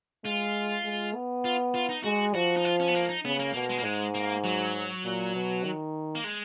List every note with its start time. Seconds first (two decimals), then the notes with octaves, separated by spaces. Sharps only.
0.24 G#3 F4
0.85 G#3
1.14 B3
1.45 F4
1.75 F4
1.89 D#4
2.04 G#3 F#4
2.34 F3 F#4
2.57 D#4
2.65 F4
2.80 C#4
2.88 B3
2.95 A#3
3.09 D#4
3.25 C#3 B3
3.39 A#3
3.54 B2 A#3
3.70 G#3
3.79 A#3
3.84 G#2 G#3
4.14 A#3
4.44 F#3
5.04 A#2
5.34 B2
5.64 D#3
6.15 A#3
6.24 G#3